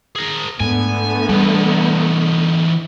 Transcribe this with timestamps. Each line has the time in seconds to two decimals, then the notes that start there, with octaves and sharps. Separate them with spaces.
0.16 G#4 A#4
0.60 G#2 D3 A3 B3 G#5
1.29 E3 G3 D4 D#4